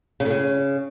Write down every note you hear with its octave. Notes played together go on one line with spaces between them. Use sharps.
C#3
A2
C#3